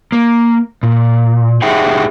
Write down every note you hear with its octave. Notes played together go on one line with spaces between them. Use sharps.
A#3
A#2
D#4 G4 G#4 E5 F#5 G5